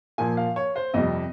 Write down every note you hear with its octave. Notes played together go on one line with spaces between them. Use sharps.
A#2 F3 A#3 G#5
F5
C#5
C5
F2 C3 G3 D#5